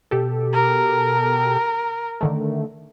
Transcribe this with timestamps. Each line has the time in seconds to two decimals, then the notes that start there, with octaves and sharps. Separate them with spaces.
0.11 B2 G4 A4
0.53 A#4
2.21 D3 D#3 A3